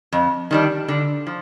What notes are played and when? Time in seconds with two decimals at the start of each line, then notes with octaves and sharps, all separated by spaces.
0.12 F2
0.51 D#3 G3 D4
0.88 D3
1.27 F3